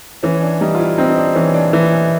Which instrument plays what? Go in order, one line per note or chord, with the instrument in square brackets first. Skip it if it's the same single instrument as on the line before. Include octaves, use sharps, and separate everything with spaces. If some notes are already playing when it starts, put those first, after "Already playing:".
[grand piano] E3 [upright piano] C#4
[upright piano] D4
[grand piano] G3 [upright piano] D#4
[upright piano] F4
E4
[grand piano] C4 [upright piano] D#4
[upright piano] D#4
D4
[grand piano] E3 [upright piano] C#4
[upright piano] D4
[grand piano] E3